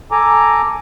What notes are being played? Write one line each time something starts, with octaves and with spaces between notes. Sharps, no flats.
A4 G#5 A#5 D6